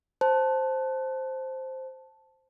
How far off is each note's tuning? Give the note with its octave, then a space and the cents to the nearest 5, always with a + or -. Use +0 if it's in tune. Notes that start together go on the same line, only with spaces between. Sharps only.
C5 +0 A5 -5